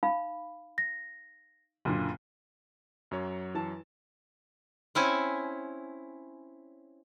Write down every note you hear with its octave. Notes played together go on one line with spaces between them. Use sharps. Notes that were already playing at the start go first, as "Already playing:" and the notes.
D#4 F5 B5
A#6
F#1 A#2 D3
F#2 F#3 C#5
E3 A5
C4 C#4 E4 C#5 G#5